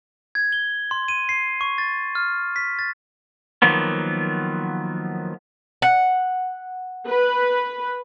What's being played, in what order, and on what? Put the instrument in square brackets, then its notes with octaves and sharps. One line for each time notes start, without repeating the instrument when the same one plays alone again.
[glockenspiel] G#6
G7
C6
D#7
C7
C#6
A6
F6
B6
A6
[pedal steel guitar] D#3 F3 F#3 A#3 B3
[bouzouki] F#5
[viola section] B4